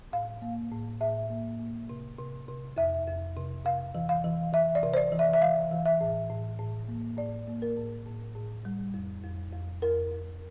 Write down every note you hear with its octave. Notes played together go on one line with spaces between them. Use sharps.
A2 F5
A#3
A2
A2 E5
A#3
A#3
C3
C3
C3
F2 E5
F2
C3
C3 F5
E3
F5
E3
E3 E5
D5
C3
C5
D5
E3
E5
E5
E3 F5
E3
E5
A2
A2
A2
A#3
A2 D5
A#3
A#4
A2
A2
A2
G3
F2
F2
F2
F2 A#4
F2